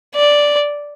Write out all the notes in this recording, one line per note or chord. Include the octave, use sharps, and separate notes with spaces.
D5